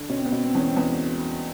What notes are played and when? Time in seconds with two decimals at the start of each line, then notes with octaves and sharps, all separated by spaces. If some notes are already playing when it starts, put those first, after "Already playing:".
Already playing: D3
0.09 B2 C#4
0.17 C4
0.25 B3
0.32 B2 C4
0.43 C4
0.55 E2 C#4
0.67 C4
0.76 E2 B3